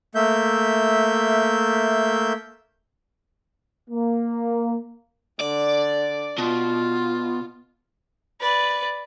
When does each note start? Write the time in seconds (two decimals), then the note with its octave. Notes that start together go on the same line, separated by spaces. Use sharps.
0.15 A3 A#3 E5 G6
3.90 A#3
5.40 D3 D5
6.38 B2 F4
8.40 B4 D5